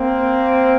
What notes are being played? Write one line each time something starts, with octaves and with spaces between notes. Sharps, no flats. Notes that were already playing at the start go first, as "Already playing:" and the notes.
Already playing: A#3 C4